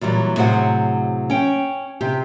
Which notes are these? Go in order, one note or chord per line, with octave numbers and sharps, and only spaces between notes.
A#2 E3 F#3 G3
A2 C3 F#3 G#4 C5 F#5
C#4 G5
C3 G4